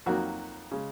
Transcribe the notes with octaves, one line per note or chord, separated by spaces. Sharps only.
F2 D#3 F#3 A#3 F#4
C#3 G#3